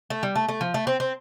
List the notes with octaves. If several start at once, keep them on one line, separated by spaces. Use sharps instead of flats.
A3
G3
A3
A3
F3
A3
C4
C4